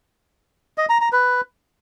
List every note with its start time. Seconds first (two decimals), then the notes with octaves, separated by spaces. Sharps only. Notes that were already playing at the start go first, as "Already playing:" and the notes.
0.78 D#5
0.89 A#5
1.01 A#5
1.13 B4